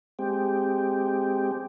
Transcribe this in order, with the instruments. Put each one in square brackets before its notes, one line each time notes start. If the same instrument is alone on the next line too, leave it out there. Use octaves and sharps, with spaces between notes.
[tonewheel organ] G#3 C4 G4